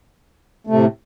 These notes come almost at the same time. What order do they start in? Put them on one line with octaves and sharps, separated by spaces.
A3 C3 A2